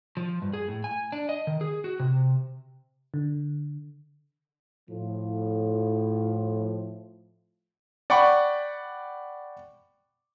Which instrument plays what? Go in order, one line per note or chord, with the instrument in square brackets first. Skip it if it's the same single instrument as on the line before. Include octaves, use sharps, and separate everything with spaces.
[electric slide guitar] F3
G2
G#4
A2
G#5
D4
D#5
D#3
G#4
F#4
C3
[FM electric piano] D3
[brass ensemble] A2 F3
[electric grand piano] D5 F#5 G5 B5 C#6